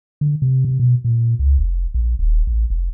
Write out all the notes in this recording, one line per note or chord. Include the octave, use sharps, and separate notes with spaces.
D3
C3
C3
B2
A#2
C#2
F1
A#1
D#1
A1
F1